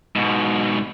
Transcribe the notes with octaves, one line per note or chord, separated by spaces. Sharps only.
G#2 B2